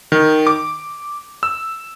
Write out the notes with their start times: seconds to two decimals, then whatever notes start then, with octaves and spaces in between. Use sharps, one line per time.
0.12 D#3
0.47 D6
1.43 E6